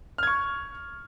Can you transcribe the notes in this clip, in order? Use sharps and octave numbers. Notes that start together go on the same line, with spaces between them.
C#6 F6 G#6